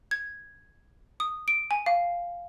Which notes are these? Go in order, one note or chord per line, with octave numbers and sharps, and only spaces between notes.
G#6
D#6
D7
G#5
F5